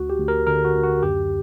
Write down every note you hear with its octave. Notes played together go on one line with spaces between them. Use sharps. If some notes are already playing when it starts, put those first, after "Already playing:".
Already playing: D2 F#4
G4
D2
A#4
D3 A#4
F#4
D2
F#4
F#2 G4